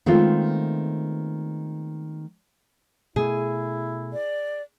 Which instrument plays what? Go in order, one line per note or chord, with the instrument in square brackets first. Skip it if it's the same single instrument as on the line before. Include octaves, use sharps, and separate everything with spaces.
[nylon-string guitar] D#3 G#3 A3 B3 C4 F4
[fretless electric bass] B2 A3 [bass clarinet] E4 [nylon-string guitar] G#4
[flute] D5